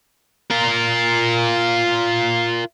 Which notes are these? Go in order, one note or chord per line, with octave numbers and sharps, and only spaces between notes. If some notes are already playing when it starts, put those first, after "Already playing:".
F4 A#4